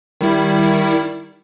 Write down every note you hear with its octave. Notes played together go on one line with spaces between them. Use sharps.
D#3 G3 E4